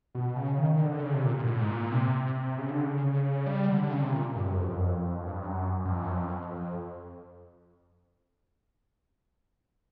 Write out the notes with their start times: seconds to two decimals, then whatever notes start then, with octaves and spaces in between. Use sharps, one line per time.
0.15 B2
0.36 C#3
0.58 D#3
0.74 D#3
0.81 D3
0.92 D3
1.03 C#3
1.14 C3
1.25 A#2
1.36 A#2
1.43 G#2
1.47 A2
1.58 G#2
1.69 A#2
1.91 C3
2.58 C#3
2.70 D3
2.83 C#3
3.46 G3
3.69 D3
3.83 D3
3.91 C#3
4.02 C3
4.13 A#2
4.36 G2
4.46 F#2
4.57 F2
4.69 F2
4.76 F#2
4.84 F2
5.24 G2
5.46 F#2
5.85 F#2
5.90 F2
6.03 F#2
6.13 F2
6.56 F2